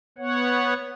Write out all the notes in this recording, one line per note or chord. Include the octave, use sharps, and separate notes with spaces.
B3 C#5 F#5